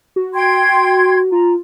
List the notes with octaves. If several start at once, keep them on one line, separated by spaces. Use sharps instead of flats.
F#4
G5 C6 G#6
F4 A#5